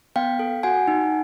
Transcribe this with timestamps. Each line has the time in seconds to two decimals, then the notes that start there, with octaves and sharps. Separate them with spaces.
0.16 B3 F5 G5
0.39 A4
0.63 F#4 F#5 G#5
0.88 D#4